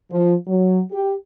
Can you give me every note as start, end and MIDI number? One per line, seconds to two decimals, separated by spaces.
0.11 0.34 53
0.47 0.80 54
0.91 1.13 67